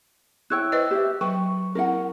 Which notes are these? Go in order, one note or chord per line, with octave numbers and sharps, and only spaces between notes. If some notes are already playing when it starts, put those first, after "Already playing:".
E4 C#5 G5 E6 F#6
B4 C5 D#5
G4 E5
F#3 B4 G5 C#6
C4 E4 A#4 F#5